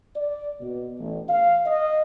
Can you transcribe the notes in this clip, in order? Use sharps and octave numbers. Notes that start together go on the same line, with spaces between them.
D5
B2
A1
F5
D#5